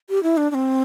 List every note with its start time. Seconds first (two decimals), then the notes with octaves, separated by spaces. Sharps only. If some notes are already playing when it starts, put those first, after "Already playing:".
0.09 G4
0.23 E4
0.37 D4
0.51 D4
0.54 C4